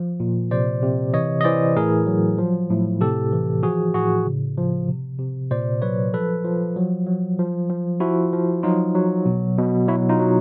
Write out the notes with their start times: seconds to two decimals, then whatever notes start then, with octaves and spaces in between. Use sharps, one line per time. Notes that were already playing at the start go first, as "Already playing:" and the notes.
Already playing: F3
0.20 A#2
0.51 C3 C5 D5
0.82 C3
1.13 E3 C#5 D#5
1.41 D#5
1.44 E3 C5 D5
1.76 A2 G#4 A#4
2.07 F#3
2.38 F3
2.70 A2
3.01 C3 G4 A4
3.32 E3
3.63 F3 F#4 G#4
3.94 A2 F#4 G#4
4.26 C#3
4.58 F3
4.88 C3
5.19 C3
5.51 A#2 C5 D5
5.82 F#3 B4 C#5
6.14 F3 A4 B4
6.45 F3
6.76 F#3
7.07 F#3
7.39 F3
7.70 F3
8.00 F3 E4 F#4
8.33 F3
8.63 F#3 D#4 F4
8.95 F#3
9.26 B2
9.58 B2
9.88 F#3 E4 F#4
10.09 D#4 F4
10.19 F#3